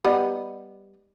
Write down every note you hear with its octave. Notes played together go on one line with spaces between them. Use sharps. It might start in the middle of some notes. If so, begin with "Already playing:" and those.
G3 B3 D#4